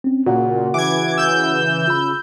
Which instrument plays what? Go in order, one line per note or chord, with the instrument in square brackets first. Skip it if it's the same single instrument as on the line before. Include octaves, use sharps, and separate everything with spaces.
[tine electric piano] C4 C#4
[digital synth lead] A#2 [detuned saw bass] C#3 [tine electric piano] F#4 F#5
[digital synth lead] E3 [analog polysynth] D6 G#6
[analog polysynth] E6 G6
[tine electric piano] F4 B5